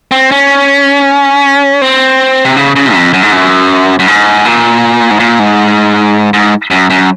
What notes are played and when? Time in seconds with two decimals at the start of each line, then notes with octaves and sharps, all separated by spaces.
0.11 C4
0.31 C#4
1.82 C4
2.45 C3
2.56 C#3
2.76 C#3
2.94 F2
3.13 F#2
3.23 G#2
3.32 F#2
3.99 F#2
4.07 G#2
4.45 A#2
5.10 G#2
5.20 A#2
5.39 G#2
6.33 G#2
6.71 F#2
6.90 F#2